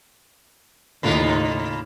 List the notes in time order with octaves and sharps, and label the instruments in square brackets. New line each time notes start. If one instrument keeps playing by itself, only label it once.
[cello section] D#2 A2 D#4 [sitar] C#3 A#3 F4